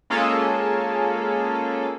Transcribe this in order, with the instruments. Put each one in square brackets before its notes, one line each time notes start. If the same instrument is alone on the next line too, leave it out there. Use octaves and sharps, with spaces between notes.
[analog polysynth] G#3 A#3 C#4 F4 G#4 A4